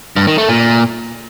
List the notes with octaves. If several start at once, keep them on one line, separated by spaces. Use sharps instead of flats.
G2
D#3
A3
A#2